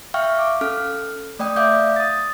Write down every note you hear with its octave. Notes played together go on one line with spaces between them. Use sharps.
E5 F5 G5 C#6 F6
F5 D6
C#4 A4 F6
A3 D5 G5 D#6
D5 E5 F5 D6 G6
D#6 A6